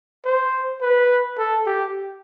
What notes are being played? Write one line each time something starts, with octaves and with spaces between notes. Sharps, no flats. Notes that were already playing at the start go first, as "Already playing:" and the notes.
C5
B4
A4
G4